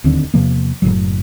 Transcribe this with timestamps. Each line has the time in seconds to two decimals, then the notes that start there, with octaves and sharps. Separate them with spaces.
0.04 D1 D#2 D3 C4
0.34 E2 C3 F3 A#3
0.82 F#1 C#2 A2 F#3